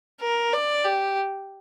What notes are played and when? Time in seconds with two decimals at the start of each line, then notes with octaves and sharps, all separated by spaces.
0.21 A#4
0.53 D5
0.84 G4